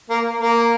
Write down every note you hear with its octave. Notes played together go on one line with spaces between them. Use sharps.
A#3
A#3